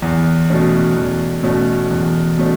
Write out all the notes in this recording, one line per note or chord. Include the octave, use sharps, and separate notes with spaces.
E2
B2 A3 C#4
E2
B2 A3 C#4
E2
B2 A3 C#4